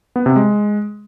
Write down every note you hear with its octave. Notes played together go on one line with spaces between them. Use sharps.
B3
C3
G#3